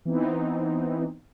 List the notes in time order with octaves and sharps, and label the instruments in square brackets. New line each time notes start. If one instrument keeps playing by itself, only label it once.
[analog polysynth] E3 B3 C4 D#4